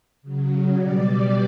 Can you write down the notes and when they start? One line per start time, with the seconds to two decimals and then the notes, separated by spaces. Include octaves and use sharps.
0.22 C#3 F#3
0.75 B2 G3 D5